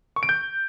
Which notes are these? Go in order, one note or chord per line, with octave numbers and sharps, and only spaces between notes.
C#6
D7
G6